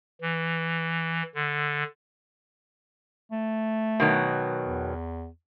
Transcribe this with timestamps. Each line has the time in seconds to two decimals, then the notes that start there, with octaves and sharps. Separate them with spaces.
0.21 E3
1.35 D3
3.31 A3
4.00 B2 D#3 F#3
4.63 E2